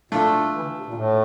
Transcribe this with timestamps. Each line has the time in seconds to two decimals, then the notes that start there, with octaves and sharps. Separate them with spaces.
0.12 A#2 A3 D4 F4 A4
0.28 C3
0.54 E3
0.61 D3
0.77 C3
0.86 A#2
0.94 A2